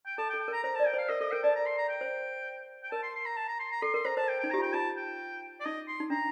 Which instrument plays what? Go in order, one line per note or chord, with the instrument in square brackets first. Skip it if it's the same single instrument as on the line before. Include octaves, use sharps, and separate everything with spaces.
[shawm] G5
[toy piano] A4 [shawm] A5
[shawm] G5
[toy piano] A4
[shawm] G5
[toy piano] A#4 [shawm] A#5
[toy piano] C5 [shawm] A#5
[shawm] A5
[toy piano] D5
[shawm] G5
[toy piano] C5 [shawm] F5
[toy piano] A#4 [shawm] D#5
[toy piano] A4 [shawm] D#5
[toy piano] A#4 [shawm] G5
[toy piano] D5 [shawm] A5
[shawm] A#5
C6
A#5
G5
[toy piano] C5
[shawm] G5
[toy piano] A#4 [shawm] A5
[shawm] C6
C6
A#5
A5
A#5
C6
A#5
[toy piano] A4 [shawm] C6
[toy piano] A#4 [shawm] C6
[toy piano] C5 [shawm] A#5
[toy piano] C5 [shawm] A5
[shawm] G5
G5
[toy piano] D#4
[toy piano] G4 [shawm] A#5
[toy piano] F4 [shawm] G5
[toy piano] F4 [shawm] A5
[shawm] G5
D5
[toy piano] D#4 [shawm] D#5
[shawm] C6
[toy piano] D#4
[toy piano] D4 [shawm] A#5